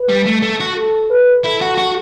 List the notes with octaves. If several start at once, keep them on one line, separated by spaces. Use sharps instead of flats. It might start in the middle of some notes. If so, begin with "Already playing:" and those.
Already playing: B4
G3
A3
A3
F#4
A4
B4
E4 A4
F#4
F#4